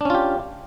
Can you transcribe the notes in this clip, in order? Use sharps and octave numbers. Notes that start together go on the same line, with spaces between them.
C#4 D4 F4 G4